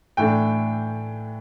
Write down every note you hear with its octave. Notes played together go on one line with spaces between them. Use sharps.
A2 E3 A3 D4 G5